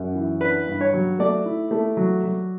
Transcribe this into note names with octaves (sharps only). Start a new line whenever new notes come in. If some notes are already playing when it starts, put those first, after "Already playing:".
Already playing: F#2
E3
D4 B4
G2
C#5
F#3
A3 D5
E4
A3
F#3
F#3